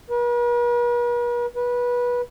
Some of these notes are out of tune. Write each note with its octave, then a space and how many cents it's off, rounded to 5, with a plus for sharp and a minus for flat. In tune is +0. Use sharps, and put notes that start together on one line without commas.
B4 -45
B4 -20